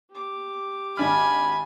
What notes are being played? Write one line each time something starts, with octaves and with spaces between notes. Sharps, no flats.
G4 D6
G#1 D4 G#5 B5 F6